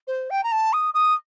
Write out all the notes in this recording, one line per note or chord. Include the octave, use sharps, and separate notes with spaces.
C5
G5
A#5
A5
D#6
D#6